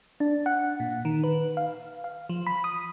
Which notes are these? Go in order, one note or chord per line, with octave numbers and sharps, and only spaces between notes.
D4
F#5
A#2
D#3
B4
F5
F5
F3
B5
D#6